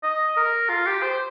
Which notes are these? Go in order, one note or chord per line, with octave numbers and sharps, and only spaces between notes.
D#5
A#4
F4
G4
C5